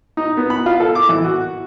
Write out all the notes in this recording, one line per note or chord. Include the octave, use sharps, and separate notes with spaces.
D#4
B3
B5
F4
A4
D6
E3
F#4